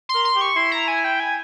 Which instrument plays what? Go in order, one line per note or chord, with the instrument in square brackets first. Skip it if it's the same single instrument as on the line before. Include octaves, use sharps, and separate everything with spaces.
[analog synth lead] C6
[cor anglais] A#4
[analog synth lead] C6
[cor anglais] G4
[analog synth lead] C#6
[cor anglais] E4 [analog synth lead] C6
[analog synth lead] A#5
G#5
G5
G#5